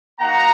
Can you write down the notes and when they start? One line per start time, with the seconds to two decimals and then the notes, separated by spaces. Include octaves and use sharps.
0.20 A#3 D#4 F#4 F#5 A#5